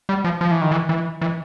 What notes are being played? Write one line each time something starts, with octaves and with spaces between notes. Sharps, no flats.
G3
F3
F3
E3
D#3
E3
E3
E3